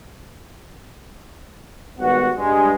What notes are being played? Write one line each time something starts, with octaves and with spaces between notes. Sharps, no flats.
G#1 G3 B3 F#4 F#5
G2 G#3